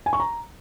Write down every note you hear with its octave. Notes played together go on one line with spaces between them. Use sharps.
G#5
C#6
A#5